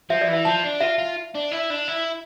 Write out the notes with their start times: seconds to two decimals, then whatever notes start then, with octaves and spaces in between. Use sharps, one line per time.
0.10 F3 E5
0.21 D5
0.28 E3 E5
0.45 F3 A5
0.63 D4
0.81 F4 E5
0.98 F4
1.35 D4
1.51 E4
1.70 D4
1.88 E4